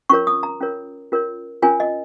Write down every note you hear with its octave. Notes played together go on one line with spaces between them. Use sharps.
C#4 F4 A#4 C#5 C#6
D#6
A#5
C#4 F4 A#4 C#5
C#4 F4 A#4 C#5
C#4 F4 A#4 C#5 G#5
D#5